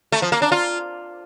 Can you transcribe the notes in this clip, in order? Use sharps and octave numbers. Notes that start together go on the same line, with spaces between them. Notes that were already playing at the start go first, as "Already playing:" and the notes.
A3
F3
A#3
D4
F4